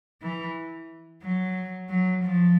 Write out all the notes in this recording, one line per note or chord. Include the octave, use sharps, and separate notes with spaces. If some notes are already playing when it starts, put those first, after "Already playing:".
E3
F#3
F#3
F3